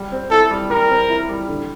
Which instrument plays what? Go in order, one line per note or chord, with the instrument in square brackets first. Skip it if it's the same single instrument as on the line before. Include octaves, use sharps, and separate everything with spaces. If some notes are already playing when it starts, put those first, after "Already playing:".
Already playing: [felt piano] G3
C4
[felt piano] E4 [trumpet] A4
[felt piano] G3
[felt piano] G3 [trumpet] A#4
[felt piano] C4
E4
G3
D3